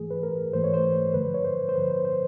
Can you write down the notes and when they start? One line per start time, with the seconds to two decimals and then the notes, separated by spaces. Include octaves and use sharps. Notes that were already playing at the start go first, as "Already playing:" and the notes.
Already playing: G#2 E3 A3 G#4
0.10 B4
0.23 A#4
0.53 G#2 E3 A3 C5
0.64 C#5
0.74 C5
1.14 G2 D3 F3 B4
1.34 C#5
1.45 C5
1.69 C5
1.75 G2 D3 F3 B4
1.90 C5
2.05 C5